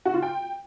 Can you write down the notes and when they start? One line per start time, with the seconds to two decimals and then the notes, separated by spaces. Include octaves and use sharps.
0.06 F#4
0.14 F4
0.22 G5